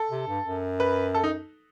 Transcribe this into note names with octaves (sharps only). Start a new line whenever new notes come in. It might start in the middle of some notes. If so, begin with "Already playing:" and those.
Already playing: A4
C3
G2
F#2
B4
A4
D#4